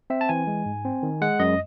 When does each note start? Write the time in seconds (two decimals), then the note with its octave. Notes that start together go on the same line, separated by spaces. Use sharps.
0.10 C4 E5
0.21 A5
0.29 E3 G#5
0.47 G#3
0.66 G#2
0.85 C4
1.03 D#3
1.22 G#3 F#5
1.39 F#2 D#5